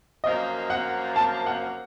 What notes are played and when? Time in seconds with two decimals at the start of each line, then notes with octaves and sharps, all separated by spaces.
0.23 F#2 F3 A#3 D#5
0.70 F#5
1.16 A5
1.46 F#5